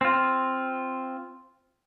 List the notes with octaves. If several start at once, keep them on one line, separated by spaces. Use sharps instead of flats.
C4 F4